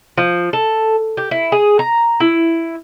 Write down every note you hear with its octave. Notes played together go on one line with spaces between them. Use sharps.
F3
A4
G4
E4
G#4
A#5
E4